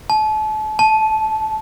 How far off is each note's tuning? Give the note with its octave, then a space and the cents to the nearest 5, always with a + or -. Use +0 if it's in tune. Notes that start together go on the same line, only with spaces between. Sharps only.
A5 -35
A5 -15